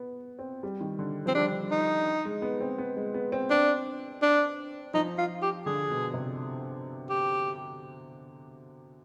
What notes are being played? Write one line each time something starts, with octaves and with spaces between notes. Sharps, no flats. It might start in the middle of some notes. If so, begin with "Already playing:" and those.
Already playing: B3
C4
G3
D#3
D3
F3 C4
G3 D4
D#4
G#3
B3
C4
B3
G#3
B3
C4
C4 D4
D4
F3 D#4
F4
G4
D3 G#4
B2
C3
G4